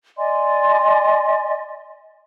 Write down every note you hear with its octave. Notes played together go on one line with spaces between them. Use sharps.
D5 D#5 G#5 C6